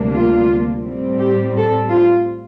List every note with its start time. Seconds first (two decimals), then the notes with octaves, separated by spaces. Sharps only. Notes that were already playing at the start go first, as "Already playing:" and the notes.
Already playing: D2 C3 G3 A#3 D4
0.14 F4
0.84 A2 G3 C4
1.20 G4
1.56 A4
1.90 F4